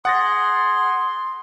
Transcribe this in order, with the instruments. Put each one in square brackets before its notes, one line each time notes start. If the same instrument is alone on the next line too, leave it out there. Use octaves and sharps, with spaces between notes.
[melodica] G#4 [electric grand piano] F#5 A6 A#6 [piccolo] C6